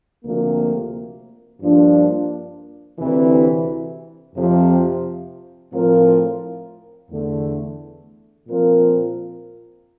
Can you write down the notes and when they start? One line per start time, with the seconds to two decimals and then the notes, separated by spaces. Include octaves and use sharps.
0.24 D2 C3 F3 A#3
1.61 G2 F3 A#3 D4
2.98 D2 C3 E3
4.35 F2 C3 F3
5.73 A2 F3 C4 F4 A#4
7.10 E2 D3 A3
8.47 A#2 F3 C4 F4 A#4